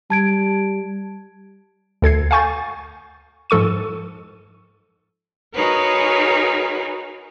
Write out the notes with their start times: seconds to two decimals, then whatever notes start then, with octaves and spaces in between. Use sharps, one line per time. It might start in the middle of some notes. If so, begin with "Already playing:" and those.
0.10 G3 A5 G#6 D7
2.02 D2 A4 G#6 C7
2.31 F5 F#5 G#5 C#6 G6 A6
3.50 G#2 F3 A4 C#6 D#7
5.55 D#4 F#4 G#4 A#4 B4 C#5